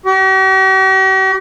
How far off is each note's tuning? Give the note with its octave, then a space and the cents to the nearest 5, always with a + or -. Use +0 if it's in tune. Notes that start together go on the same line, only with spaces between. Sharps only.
G4 -45